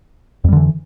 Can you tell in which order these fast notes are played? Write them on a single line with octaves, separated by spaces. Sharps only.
F2 G3 D3 E3